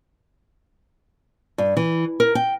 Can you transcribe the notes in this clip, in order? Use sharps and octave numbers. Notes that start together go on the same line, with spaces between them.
G2
E3
A#4
G5